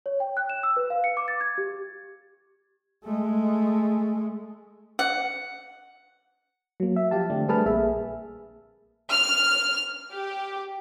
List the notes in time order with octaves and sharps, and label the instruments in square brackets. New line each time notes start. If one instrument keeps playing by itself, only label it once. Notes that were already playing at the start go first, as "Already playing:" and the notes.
[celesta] C#5
G5
F#6
E7
E6
B4
F5
C#7
D6
A6
G#6
G4
[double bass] G#3 A3
[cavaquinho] F#5
[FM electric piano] F#3 A#3
E5
F3 G4 F5 A5
D3 A3 C4 D4
G3 A3 G#4 B4 A5 F6
A#1 A#3 G#4 E5
[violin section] F6
G4